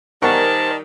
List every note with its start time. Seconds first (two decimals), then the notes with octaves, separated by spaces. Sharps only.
0.22 D#3 G3 A#4 C5 F#5 G#5 A5 C#6